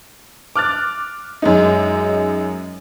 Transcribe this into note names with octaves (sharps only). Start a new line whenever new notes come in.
D6 F6 F#6 A6
F#2 G#3 D#4